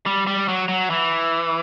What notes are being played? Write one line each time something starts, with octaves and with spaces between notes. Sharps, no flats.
G3
G3
F#3
F#3
E3